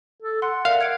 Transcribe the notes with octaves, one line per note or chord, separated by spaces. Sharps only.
A4
F#5 C6
A#4 D5 E5 F5
G#6 C#7 D7